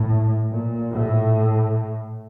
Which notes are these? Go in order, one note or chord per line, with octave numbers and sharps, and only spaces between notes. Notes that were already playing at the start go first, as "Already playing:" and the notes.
Already playing: A2
A#2
A2